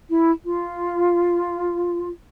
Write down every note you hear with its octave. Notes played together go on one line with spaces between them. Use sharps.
E4
F4